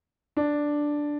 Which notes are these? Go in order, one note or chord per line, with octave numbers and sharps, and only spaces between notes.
D4